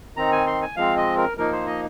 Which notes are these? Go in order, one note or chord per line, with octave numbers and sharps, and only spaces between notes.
D#3 C4 D#4 A#5
G#5
C6
G#5
F3 G#3 C4 F5
D#5
A#4
F3 A#3 D#4 A#4
C5
D#5